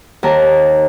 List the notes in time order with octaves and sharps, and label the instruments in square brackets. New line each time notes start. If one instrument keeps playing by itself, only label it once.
[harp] D#2 A#4 A5